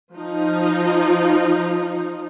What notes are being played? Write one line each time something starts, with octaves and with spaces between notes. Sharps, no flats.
F3 D#4